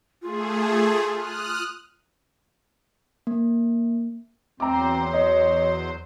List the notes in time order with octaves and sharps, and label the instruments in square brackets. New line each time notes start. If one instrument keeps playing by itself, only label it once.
[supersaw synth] A3 G#4 [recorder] F4
[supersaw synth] D#6 F6 F#6
[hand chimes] A#3
[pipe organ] E2 F#3 C5 [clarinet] C4 [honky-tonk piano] A#5 D6
[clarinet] C#5 [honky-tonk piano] D#5